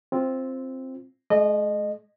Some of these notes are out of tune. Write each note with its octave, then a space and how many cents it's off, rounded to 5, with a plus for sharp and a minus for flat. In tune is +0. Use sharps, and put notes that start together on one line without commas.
C4 +5 F4 -10
G#3 +40 D#5 -20